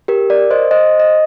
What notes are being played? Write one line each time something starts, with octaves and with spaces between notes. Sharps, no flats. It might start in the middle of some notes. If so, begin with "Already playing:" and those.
G4 A#4
A#4 D5
C5 D#5
C5 D#5
D#5